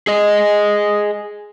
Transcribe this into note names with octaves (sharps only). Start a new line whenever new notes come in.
G#4 D#5